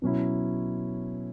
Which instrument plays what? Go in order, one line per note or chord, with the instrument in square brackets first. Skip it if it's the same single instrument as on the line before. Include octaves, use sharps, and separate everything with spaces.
[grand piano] B2 F#3 C#4 E4